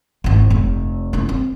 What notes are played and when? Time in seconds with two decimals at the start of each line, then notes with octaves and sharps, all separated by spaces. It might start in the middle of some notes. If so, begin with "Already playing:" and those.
0.24 G#1 E4
0.50 F1
1.13 C#4 E4
1.29 C4